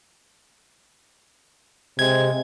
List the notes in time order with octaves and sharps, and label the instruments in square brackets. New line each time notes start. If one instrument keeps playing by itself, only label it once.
[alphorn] C3 [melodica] G#3 [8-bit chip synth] G#6